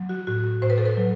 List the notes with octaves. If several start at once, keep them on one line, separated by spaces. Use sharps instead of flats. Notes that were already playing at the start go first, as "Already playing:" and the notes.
Already playing: F#3
F#4
A2 F#4
A2 C5
B4
A4
B4
F#3